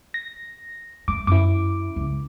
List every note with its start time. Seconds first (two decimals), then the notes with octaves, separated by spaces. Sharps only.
0.14 A#6
1.08 A3 D6
1.27 F#2 E4 D6
1.96 C#2